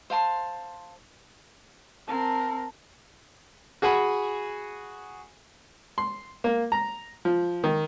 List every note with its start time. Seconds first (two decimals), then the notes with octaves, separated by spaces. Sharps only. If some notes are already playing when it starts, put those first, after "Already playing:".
0.10 C5 F5 A5 C6
2.08 C4 A#4 A5
3.82 F#4 G#4 F#5 G#5 B5
5.98 C6
6.44 A#3
6.72 A#5
7.25 F3
7.64 D#3